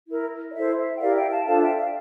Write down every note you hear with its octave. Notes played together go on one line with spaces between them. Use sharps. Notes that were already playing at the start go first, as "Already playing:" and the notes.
E4 A#4
D5
E4 A4 C5 E5
E5
G5
E4 G4 A#4 D5 F5
E5 G5
F5 A5
D4 F4 A4 C5 F5 A5
E5 G5
D5 F5